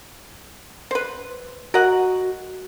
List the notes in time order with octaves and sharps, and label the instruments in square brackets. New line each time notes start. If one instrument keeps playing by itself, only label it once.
[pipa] B4 C5
[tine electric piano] F#4 [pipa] A#4 D#5 F#5